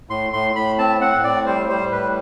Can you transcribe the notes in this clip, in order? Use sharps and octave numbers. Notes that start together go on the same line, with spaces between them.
A2 C6
A2 C6
A2 B5
C4 A5
C4 F#5
A2 D5
G3 C5
G3 C5
A2 B4